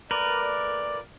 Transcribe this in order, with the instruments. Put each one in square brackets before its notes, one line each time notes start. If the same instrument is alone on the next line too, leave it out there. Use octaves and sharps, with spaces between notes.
[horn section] A#2 A3 D5 [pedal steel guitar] A#4 B4